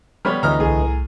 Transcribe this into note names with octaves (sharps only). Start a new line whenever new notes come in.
G3 B3 C#5 F6
D2 E3 D#5 A#5 F6
C2 A2 G#4